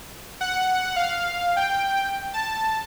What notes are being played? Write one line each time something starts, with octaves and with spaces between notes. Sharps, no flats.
F#5
F5
G5
A5